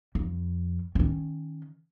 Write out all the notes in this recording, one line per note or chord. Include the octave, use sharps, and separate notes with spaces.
F2
D#3 C#4